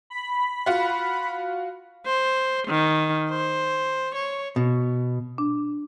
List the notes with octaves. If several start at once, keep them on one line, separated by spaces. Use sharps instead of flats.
B5
F4 F#4
C5
D#3
C5
C#5
B2
D4